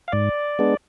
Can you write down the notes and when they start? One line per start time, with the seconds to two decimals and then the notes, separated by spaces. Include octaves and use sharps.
0.08 F5
0.12 G#2 D5
0.59 G#3 B3 D4